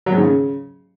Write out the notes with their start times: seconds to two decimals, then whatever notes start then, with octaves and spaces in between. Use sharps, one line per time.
0.06 F#3
0.12 G#2
0.17 D#3
0.23 C#3